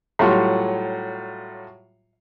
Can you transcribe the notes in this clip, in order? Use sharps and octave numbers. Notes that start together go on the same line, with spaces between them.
A2 F#3 G3 F4 C6 C#6